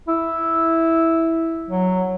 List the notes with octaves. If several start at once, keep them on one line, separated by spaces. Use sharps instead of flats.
E4
F#3